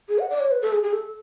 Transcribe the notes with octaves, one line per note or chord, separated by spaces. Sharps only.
G#4
F#5
D5
C#5
B4
A4
G#4
G#4
A4